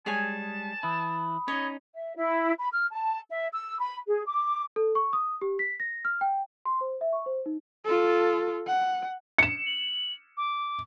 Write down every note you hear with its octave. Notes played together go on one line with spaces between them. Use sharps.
G3 G#3 G#4 C#5 G#5 A5
E3 E4 B5 D#6
C#4 D#4 C#5 D#5
E5
E4
B5
F6
A5
E5
E6
B5
G#4
D6
A4
C#6
D#6
G4
B6
A#6
F6
G5
C6
C5
E5
C#6
C5
D#4
F4 A4
F#5
C#7 E7
F#7
D6